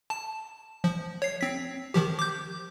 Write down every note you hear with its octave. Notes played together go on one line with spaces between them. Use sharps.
A5
F3
C#5 C7
C4 B6
D#3 F3 G4
D6 G6